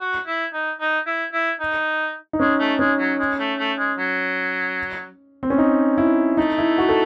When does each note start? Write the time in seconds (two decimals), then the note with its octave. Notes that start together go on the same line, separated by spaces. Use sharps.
0.01 F#4
0.27 E4
0.53 D#4
0.80 D#4
1.07 E4
1.33 E4
1.60 D#4
2.33 D#4
2.40 G#3 C#4
2.60 A3
2.79 G#3 C#4
2.99 F#3
3.19 G#3
3.39 A3
3.59 A3
3.79 G#3
3.98 F#3
5.43 C4
5.50 C#4
5.58 D#4
5.98 E4
6.37 A3 D#4
6.58 E4
6.78 F#4
6.89 A4